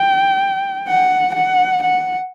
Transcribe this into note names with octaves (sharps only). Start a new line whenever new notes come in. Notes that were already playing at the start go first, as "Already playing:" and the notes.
Already playing: G5
F#5
F#5
F#5